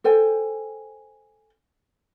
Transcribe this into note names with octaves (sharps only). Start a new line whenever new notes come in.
A4 C5 G5 G#5